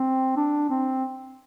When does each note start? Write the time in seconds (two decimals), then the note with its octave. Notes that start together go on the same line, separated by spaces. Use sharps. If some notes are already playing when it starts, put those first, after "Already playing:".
Already playing: C4
0.36 D4
0.69 C4